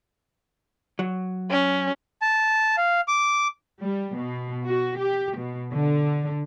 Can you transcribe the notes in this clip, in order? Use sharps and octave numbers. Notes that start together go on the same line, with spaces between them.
F#3
C#4
A5
F5
D6
G3
B2
F#4
G4
B2
D3